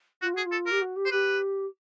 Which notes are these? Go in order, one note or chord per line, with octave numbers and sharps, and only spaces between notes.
F4 F#4
F#4 G#4
F4
A4
G4 A#4
F#4
G4
C5
G4 B4